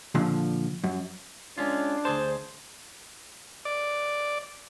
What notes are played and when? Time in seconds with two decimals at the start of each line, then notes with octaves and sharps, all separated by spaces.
0.15 A#2 D3 F3
0.84 F#2
1.58 G#3 C#4 D4 F4
2.05 D2 G#4 C5 A5
3.65 D5